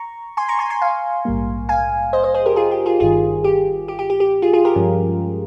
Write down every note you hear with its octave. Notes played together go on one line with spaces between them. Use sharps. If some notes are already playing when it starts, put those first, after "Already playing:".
Already playing: A#5 C#6
G#5 C6
A#5 C#6
G#5 C6
G#5 C6
F5 G#5
A#1 G#2 G3 A#3
F5 G#5
C5 D#5
C5 D#5
G#4 C5
G4 A#4
F4 G#4
G4
F4 G#4
G1 G2 D#3 F4 G#4
G4
G4
G4
G4
G4
F4 G#4
F4 G#4
G4 A#4
G2 F3 G#3 C#4